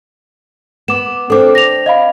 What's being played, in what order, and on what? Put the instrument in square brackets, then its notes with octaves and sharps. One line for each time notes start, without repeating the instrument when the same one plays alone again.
[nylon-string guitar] B3 [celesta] D6 E7
[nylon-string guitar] C4 D4 [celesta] A4 D6
[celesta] A#6 F7
D#5 F5 B5